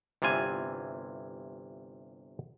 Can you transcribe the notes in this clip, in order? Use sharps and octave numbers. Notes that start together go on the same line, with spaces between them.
G1 C3 E3 F4 G#5